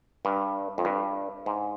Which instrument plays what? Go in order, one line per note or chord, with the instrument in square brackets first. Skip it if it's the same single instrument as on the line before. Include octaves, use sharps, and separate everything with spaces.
[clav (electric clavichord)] G2
F2
G2
G#2